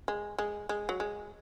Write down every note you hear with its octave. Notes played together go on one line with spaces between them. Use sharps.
G#3
G#3
G#3
F#3
G#3